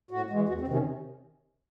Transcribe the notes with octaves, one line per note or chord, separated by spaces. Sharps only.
A2 F#4
E3 G#3
E2 F#4
C4
C3 D#3
C#4